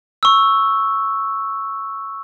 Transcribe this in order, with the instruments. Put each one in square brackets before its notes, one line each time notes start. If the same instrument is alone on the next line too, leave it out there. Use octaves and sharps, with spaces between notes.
[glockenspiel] C#6 E6